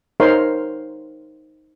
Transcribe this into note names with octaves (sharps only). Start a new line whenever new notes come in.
D#4 A#4 C5 C#5 F5 C6